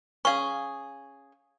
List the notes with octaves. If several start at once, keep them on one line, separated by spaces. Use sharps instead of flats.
C#4 G#4 F5 C#6